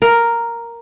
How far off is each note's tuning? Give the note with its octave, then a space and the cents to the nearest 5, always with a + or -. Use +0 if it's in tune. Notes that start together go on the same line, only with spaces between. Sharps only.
A#4 +0